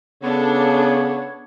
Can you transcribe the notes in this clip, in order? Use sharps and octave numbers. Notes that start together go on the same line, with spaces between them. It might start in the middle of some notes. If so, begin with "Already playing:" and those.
C#3 B3 D4 A4 C#5